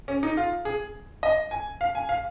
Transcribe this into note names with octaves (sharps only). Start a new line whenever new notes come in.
C#4
D#4
F4
G#4
D#5
G#5
F5
G#5
F5